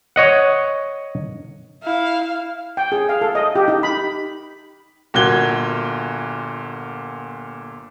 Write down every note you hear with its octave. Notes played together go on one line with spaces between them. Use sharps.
C#5 D#5 F#5
E4 F5
G5
G#4
F5
A4
D#5
G4
D#4
B5
G1 A#2 F#4 F#6 G#6 G7